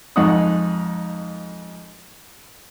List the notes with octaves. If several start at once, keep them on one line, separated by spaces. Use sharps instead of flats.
F2 G#2 D#4 F#5 C#6 D#6